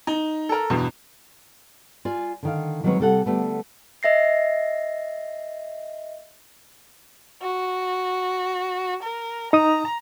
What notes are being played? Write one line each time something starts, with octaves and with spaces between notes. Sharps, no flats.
D#4
A4 A#4
E2 G2 B2
F4 D5 G#5
D3 D#3 F5
D#3 F#3 G#3 C4 B4 C#5
C3 G3 A4 F#5
D3 G3 A3 B3
D#5 E5 A#6 C7
F#4
A#4
D#4 A#5 D#6